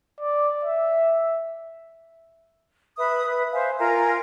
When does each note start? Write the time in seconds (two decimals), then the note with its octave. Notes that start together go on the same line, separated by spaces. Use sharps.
0.21 D5
0.65 E5
2.98 B4 E5 B5 D#6
3.26 B4
3.52 C5 E5 F5 G#5
3.79 F4 A#4 G#5 A#5